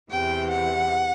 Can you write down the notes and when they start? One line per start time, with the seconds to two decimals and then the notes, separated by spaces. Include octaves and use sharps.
0.10 E2 C3 E3 G5
0.50 F#5